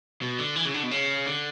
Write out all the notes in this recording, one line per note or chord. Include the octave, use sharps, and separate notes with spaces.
B2
D3
E3
C#3
D3
B2
C#3
D3